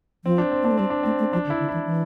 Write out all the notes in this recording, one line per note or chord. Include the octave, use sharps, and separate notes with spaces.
F3 C4
D4
C4
A#3 D4
A3
G3 C4
D4
A3 C4
A3
F3 D4
D3
E4
D3
E3 E4
E3